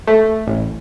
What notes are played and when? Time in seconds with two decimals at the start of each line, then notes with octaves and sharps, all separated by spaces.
0.07 A3
0.47 A1